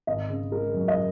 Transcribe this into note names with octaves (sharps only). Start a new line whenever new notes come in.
G#1 D#5
C#3
G#3 A#4
F#2
D#5